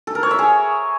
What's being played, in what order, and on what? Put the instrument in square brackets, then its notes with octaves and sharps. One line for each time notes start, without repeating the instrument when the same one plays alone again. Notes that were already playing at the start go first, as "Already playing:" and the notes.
[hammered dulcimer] A4
A#4
C#5
E5
G#4